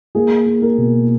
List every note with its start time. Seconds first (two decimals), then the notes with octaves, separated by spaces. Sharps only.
0.15 A#3 G#4
0.46 A#3
0.62 A#4
0.78 B2